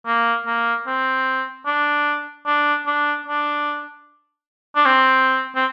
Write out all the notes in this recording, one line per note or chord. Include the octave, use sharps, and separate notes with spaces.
A#3
A#3
C4
D4
D4
D4
D4
D4
C4
C4